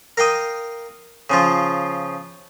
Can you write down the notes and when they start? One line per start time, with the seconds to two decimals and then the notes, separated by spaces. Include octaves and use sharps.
0.17 A#4 F5 G5 D#6
1.30 C#3 F3 F4